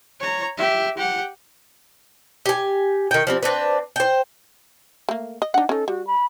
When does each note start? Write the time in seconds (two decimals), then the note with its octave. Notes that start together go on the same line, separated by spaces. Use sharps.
0.20 C#5 A#5
0.57 G4 E5
0.97 G4 F#5
2.46 G4 G#5
3.11 D#3 G5
3.27 F3 G3 C4
3.43 C4 D4 B4
3.96 C5 G5
5.09 A3 A#3
5.42 D#5
5.54 D4 D#4 F#5
5.69 C#4 D#4 A4
5.88 G3 F#4
6.07 B5